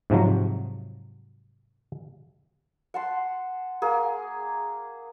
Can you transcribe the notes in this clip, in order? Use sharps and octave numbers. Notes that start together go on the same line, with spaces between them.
G#2 C3 F3 F#3
F#5 A5 C6
A#3 G#4